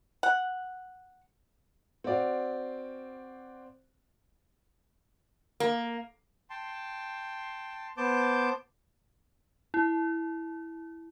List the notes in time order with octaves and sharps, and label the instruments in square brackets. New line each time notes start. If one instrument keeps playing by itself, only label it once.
[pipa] F#5
[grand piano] C4 F#4 D5 F5
[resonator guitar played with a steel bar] A#3
[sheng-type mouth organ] G5 A5 C6
B3 C5 A5 D6 G6
[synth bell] E4